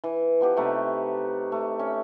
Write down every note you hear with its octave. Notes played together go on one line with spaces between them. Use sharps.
E3
F3 B3 G4
C3 A3 D#4 B4
A3
C#4